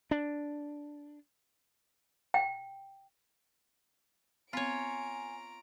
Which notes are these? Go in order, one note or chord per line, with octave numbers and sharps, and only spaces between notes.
D4
G5
B3 C4 F4 C#5 G#5 A#5 D7